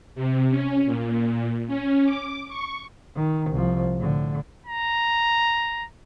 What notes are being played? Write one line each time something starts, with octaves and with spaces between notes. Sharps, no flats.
C3
C#4
A#2
C#4
D6
C#6
D#3
C2 F3
A2 D3
A#5